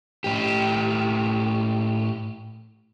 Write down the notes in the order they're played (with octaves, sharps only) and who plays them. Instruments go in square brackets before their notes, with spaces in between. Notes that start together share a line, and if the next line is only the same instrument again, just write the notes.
[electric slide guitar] A2 G4